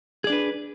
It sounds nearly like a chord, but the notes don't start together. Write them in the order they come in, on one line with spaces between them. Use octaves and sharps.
G#4 D5 D4 B4